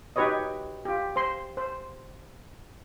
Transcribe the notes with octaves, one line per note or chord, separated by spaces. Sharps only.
D#4 F#4 G4 B4 C#5 D#5
F4 G4
C5 C6
C5